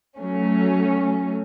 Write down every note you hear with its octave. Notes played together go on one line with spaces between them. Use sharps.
F#3 A3 C#4